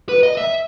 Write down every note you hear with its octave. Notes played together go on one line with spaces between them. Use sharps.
B4
D#5
E5